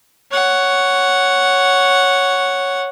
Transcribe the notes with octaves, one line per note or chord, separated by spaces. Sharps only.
C#5 F#5